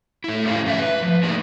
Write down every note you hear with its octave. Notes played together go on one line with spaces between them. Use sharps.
A3 E4
C#4 E4 G4 C5 C#5 F5
G#2 E3 E4 A4 E5
B4
F3
A3 A#3 D4 D#4 G4 G#4